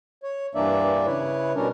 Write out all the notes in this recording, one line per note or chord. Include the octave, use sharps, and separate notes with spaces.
C#5
G2 E3 A#3 D4 D5 E5
C#3 E4 B4 C#5
B2 G3 C#4 D4 A#4